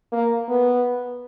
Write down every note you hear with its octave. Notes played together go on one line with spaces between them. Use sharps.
A#3
B3